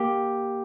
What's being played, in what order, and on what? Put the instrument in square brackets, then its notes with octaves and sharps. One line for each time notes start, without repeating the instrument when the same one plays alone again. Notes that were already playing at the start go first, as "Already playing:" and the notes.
Already playing: [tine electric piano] A#3 G4